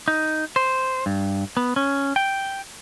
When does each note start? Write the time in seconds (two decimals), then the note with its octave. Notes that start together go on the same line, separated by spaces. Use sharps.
0.08 D#4
0.56 C5
1.06 G2
1.57 B3
1.76 C#4
2.16 G5